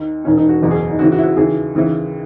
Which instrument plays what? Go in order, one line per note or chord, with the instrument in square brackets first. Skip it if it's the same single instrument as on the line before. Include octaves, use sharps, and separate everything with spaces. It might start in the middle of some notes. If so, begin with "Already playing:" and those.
Already playing: [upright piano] D#2 D#3 D#4
E1 D#2 D#3 C#4
D#4
F#4
F#1 E2 B2
G#4
D#4
D#2 C#3 E3 F#4
F#4
E4
F#4
D#2 C#3 E3 G#4
D#2 C#3 E3